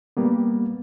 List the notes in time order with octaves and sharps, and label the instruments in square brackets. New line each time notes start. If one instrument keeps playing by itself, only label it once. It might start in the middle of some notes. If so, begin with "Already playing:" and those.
[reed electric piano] G3 A#3 B3